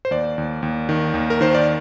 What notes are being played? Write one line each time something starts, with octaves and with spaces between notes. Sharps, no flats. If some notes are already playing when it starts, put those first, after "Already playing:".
C5
D#2 D5
D#2
D#2
D#3
D#2
A#4
D#3 C5
D5